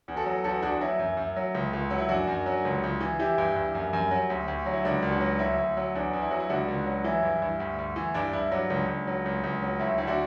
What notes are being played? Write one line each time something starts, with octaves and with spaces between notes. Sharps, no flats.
E2
F#4 A4
F#3
E2 F#4 A4
E2 D4 F#4
D4
F#3 E4
F#2
F#2
F#3
C#2
C#2
F#3
E4
F#2 D4 F#4
F#2
F#3
C#2
C#2
E3
E3 E4 G4
G2
G2
F#2
F#2
F#3
D2
D2
F#3
E4
C#2 D4 F#4
C#2
D4 F#4
F#3
D2 E4
D2
F#3
E2 D4
E2
E4
F#3 F#4
E4
C#2 D4 F#4
C#2
F#3
E3 E4
G2
G2
D2
D2
E3
G2 D4
G2 E4
F#3 D4
C#2
C#2
F#3
C#2
C#2
F#3
D2 E4
D2 E4
D4 F#4